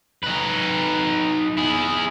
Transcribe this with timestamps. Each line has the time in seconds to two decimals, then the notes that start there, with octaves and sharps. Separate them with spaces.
0.24 D#4 B4
1.57 E4 G#4